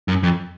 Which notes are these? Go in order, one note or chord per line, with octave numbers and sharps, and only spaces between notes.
F#2
F2